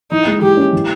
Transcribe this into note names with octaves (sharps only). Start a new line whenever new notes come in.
E3 D#4
G#3
E3 G4
C#4
E3